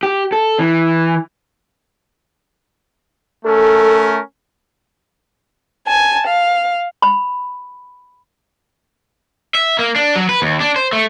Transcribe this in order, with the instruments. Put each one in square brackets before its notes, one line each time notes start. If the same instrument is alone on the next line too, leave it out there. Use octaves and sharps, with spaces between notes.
[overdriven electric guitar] G4
A4
E3
[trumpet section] A3 C#4 A#4 [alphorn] A4
[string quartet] G#5 A5
F5
[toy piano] B5
[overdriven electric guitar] E5
A#3
D4
F#3
B4
D#2
D4
C5
A3